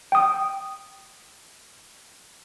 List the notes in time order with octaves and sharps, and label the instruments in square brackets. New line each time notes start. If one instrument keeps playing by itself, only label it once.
[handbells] G5 D#6